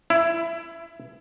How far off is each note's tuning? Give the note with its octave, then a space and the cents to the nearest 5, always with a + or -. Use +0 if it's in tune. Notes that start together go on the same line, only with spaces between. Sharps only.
E4 +15